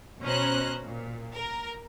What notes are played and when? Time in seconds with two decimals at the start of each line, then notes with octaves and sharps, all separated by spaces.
0.23 B2 C#4 C5 A#5 F#6
0.85 A#2
1.34 A#4